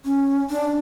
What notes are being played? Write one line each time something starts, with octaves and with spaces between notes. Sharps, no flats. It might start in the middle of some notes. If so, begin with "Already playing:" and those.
C#4
D4